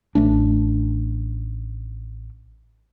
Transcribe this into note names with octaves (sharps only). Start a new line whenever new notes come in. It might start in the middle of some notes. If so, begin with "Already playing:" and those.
A1 A3 D4